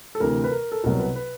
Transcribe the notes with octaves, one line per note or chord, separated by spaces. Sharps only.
A4
D2 C3 E3 A#4
B4
A#4
A4
C2 B2 F#3 A#4
B4
B4